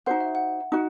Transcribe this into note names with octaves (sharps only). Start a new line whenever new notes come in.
D#4 F#4 C5 F#5
E5
F#5
D#4 F#4